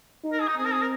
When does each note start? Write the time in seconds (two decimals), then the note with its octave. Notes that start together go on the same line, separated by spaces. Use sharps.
0.24 D#4
0.33 A#4
0.40 G#4
0.48 D#4
0.56 C4 G#4
0.65 A#4
0.73 G#4
0.81 A#4